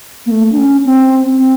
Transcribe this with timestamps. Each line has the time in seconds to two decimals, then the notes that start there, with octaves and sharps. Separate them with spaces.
0.26 A#3
0.31 A3
0.52 D4
0.58 C#4
0.85 C4
1.39 C4